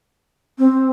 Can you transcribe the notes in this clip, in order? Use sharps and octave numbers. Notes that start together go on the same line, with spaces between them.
C4